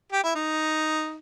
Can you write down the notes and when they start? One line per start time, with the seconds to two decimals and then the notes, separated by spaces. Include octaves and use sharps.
0.12 G4
0.24 E4
0.35 D#4